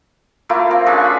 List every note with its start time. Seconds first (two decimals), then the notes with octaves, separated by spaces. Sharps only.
0.49 A3 A#3 E4 F4
0.71 C4
0.86 C#4 D4 F4 G#4
1.00 B5 C#6